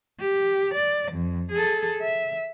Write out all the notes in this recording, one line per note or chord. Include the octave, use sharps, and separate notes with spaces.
G4
D5
F2
G#4 A4
E5